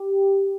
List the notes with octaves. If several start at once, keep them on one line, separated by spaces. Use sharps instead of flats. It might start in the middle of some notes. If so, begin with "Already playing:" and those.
Already playing: G4